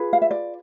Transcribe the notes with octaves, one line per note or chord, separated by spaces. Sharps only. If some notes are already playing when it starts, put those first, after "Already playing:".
Already playing: F4 G#4 B4
F5
E5
D5